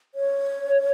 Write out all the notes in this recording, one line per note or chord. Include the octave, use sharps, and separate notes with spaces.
C#5